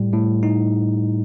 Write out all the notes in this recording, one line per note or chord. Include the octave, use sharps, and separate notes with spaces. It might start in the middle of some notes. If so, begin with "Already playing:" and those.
Already playing: A2 G3
A2
D#4